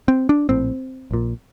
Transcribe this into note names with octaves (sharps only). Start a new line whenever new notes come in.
C4
D4
A#1 A2 C4
A#1 A#2